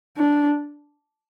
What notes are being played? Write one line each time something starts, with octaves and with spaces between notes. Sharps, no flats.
D4